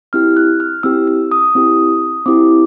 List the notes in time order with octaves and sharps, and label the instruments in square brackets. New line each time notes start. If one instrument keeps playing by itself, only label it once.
[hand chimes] C4 E4 G4 F6
F#6
F6
C4 E4 G4 E6
E6
D#6
C4 E4 G4
C4 E4 G4 D6